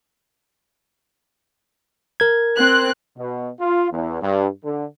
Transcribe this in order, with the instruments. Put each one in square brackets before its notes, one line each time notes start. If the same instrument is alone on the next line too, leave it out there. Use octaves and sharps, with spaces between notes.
[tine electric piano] A#4 G#6
[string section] C4 F#6
[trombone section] B2
F4
E2
G2
D3